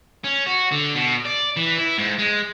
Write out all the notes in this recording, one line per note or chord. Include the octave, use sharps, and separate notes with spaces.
C#4
F#4
D3
B2
D5
E3
E4
G#2
G#3